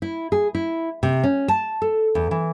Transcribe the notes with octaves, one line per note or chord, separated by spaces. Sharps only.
E4
G#4
E4
C3
C#4
A5
A4
E2
E3